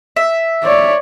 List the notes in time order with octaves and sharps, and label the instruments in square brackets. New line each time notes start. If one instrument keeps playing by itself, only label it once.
[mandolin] E5
[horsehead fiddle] C#5 D5